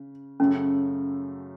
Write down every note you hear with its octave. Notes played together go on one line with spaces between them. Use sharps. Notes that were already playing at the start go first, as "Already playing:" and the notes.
Already playing: C#3
F#2 C#3 F#3 A3 C#4